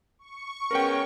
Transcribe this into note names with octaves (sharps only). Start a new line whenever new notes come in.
C#6
G#3 B3 C#4 A#4 G5